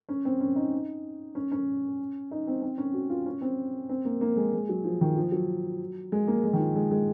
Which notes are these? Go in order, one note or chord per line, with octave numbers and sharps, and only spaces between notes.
C#4
C4
C#4
D#4
C#4
C#4
D#4
C4
C4
C#4
F#4
F4
C#4
C4
C4
A#3
A#3
G#3
G#3
F#3
F3
D#3
F3
F#3
G#3
A#3
G#3
D#3
F3
G#3
G#3